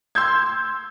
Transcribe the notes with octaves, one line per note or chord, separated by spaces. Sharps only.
C6 E6 G6 G#6